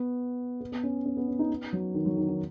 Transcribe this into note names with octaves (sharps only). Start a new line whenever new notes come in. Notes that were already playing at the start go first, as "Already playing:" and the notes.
Already playing: B3
B3
B3
C#4
C#4
B3
C#4
D#4
B3
F#3
D#3
F#3
D#3
D#3